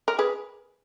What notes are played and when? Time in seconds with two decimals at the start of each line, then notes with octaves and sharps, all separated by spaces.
0.08 A#4
0.19 G#4 B4